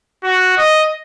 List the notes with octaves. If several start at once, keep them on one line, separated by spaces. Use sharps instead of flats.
F#4
D#5